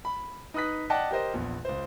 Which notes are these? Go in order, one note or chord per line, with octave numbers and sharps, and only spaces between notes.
B5
D#4 B4 D#6 F#6 B6
D5 D#5 F#5 G5 A5 F#6
G4 A#4 C5 D#5
A#1 E2
C#2 C5